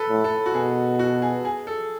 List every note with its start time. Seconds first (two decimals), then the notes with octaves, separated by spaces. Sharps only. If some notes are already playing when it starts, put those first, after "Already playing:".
Already playing: A4 B4
0.09 A2
0.24 A4
0.46 F#4
0.54 B2 G#4
0.99 F#4
1.22 G#4
1.45 G#4
1.67 A4